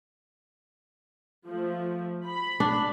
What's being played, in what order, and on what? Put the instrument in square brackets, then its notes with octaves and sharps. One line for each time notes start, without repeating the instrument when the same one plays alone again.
[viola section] F3 A3
B5
[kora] D4